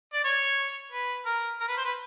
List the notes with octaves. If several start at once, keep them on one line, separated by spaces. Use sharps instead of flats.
D5
C#5
B4
A#4
A#4
B4
C5
B4